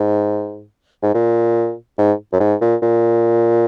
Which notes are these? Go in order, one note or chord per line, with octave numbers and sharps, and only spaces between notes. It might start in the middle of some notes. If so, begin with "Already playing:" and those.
Already playing: G#2
G#2
A#2
G#2
F#2
G#2
A#2
A#2